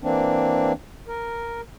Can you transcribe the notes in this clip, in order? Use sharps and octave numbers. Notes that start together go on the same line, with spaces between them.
E3 A#3 C4 D4
A#4